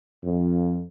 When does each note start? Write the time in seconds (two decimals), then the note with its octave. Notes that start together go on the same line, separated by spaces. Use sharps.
0.24 F2